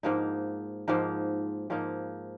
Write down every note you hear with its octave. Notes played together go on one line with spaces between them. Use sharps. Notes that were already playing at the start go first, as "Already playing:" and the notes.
G#2 F3 A#3 D#4
G#2 F3 A#3 D#4
G#2 F3 A#3 D#4